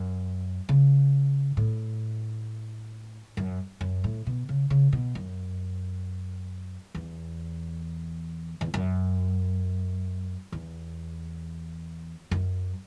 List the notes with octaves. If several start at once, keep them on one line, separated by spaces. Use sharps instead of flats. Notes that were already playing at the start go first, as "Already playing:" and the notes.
Already playing: F#2
C#3
A2
F#2
F#2
A2
B2
C#3
C#3
B2
F#2
E2
E2
F#2
E2
F#2